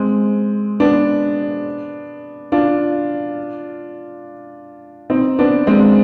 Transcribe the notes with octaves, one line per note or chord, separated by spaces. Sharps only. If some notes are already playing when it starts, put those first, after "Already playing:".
Already playing: G#3 C4
B3 D4
D4 F4
C4 D#4
B3 D4
G#3 C4